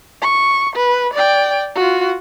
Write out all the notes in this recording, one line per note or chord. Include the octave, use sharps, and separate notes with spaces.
C#6
B4
D5 G5
F4 F#4